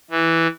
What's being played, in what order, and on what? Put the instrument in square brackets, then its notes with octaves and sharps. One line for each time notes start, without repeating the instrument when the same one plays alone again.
[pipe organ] E3